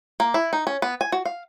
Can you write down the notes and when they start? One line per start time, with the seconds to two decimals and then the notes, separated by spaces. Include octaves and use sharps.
0.20 A#3
0.34 E4
0.53 D#4
0.67 C#4
0.82 B3
1.01 G#5
1.12 F#4
1.25 F5